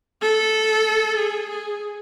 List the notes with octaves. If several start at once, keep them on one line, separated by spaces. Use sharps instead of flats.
A4
G#4
G#4